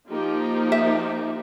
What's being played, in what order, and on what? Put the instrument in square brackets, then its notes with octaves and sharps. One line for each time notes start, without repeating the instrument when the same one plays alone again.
[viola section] F3 A#3 D#4 G4
[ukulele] E5